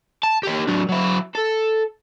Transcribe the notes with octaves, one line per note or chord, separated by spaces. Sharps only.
A5
A#3 G4
F#3 D4
F#3 E4
A4